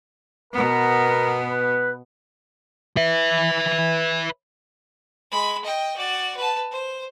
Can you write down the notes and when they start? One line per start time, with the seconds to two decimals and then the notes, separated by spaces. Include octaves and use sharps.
0.53 B2 B3 A#4
1.50 B4
2.97 B4 E5
5.31 G#3 B5
5.64 D#5 G5
5.96 F#4 D5
6.37 B4 A5
6.71 C5